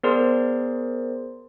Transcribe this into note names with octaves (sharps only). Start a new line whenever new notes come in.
B3 G#4 A#4 C5 D5 C6